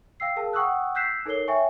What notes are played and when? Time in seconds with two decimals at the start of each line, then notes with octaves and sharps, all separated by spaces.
0.20 F5 G5 E6 C7
0.36 G#4 A#4 F5 A5
0.53 F#5 G5 C#6 D#6 E6 F#6
0.95 E6 F#6 G6 B6 C7 E7
1.25 D#4 A4 A#4 C#5 C7 G7
1.48 C#5 E5 G5 G#5 C#6